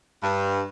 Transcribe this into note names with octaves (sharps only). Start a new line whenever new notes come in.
G2